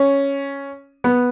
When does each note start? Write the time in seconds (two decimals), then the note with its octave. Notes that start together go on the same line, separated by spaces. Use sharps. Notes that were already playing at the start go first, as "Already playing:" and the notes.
Already playing: C#4
1.04 B3